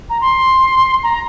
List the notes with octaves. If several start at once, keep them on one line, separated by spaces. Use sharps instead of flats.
A#5
C6
A#5